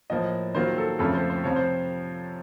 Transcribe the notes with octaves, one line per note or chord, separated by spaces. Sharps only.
A2 F3 A#3 D#5
D#3 F#3 A#3 F4 C5
A4
F2 C#3 A3 C4 F4 A4
C5
C5
C3 F3 C4 F4 C#5
C5